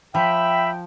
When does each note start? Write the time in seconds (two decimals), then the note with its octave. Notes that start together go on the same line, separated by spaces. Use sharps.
0.15 F3 E5 G5 B5